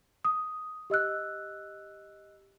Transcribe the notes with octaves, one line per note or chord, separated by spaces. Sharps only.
D#6
G4 D#5 E6 F#6